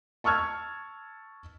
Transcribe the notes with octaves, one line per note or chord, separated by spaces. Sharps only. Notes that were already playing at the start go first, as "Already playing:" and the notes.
A5 C#6 E6 F6 G#6